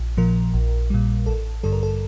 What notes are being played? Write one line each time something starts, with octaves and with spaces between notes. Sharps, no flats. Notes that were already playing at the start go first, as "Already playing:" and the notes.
Already playing: A#1
A#2 F3 A#4
A#1
A#2 G3
A1 A4
G2 D3 G3 A4
A#4
A4